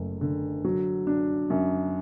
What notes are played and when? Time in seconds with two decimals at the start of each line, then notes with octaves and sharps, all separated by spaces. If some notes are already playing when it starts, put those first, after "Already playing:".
Already playing: F#1 A3
0.21 D3
0.64 F#3
1.07 D4
1.50 F#2